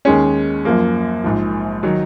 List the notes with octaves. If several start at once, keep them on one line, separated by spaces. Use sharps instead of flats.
D#2 D#3 G#3 C#4
F#2 F3 A#3
A#1 G#2 F3
D#3 F#3